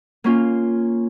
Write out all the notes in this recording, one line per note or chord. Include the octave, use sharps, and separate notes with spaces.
A#3 C#4 F4